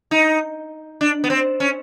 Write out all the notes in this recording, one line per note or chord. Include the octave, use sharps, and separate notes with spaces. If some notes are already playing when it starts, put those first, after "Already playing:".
D#4
D4
B3
C4
C#4